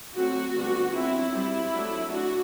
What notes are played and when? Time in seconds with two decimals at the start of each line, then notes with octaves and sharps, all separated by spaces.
0.16 F#3 A3 C4 F#4
0.56 D3 G3 B3 D4
0.95 F#3 C4 E4
1.34 G3 C4 E4
1.74 F#3 A3 D4
2.13 D4 F#4